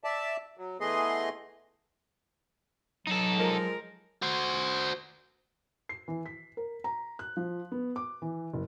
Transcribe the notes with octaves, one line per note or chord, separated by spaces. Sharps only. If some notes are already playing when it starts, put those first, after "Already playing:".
D5 E5 A5
F#3
E3 A3 B3 G#4 D#5 C6
F#3 D#4 A4
F3 G#3 A#4
F#4 C5
C7
E3
B6
A#4
A#5
F#6
F3
B3
D6
E3
F#1